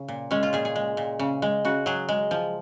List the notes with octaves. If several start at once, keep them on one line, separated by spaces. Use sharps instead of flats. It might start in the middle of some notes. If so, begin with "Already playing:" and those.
Already playing: C#3
A#2
G#3 C#4
F4
A#2 G#4
G#4
G#3
A#2
C#3
G#3
C#3 F#4
F#3 G#4
G#3
F3